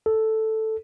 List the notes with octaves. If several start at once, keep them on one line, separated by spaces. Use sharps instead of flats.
A4